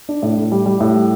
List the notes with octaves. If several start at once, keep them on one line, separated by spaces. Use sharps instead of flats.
D4
A2
A2
G3
G3
A2
G3